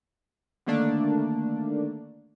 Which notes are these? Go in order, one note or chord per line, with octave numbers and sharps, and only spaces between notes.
D3 D#3 A3 A#3 D4